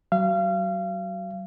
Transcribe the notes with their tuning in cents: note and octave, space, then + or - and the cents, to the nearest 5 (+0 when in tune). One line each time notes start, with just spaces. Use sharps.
F#3 +30 F5 -30